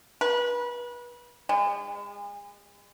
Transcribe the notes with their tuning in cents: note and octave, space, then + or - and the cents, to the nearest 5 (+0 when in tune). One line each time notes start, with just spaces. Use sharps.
B4 -30
G#3 -35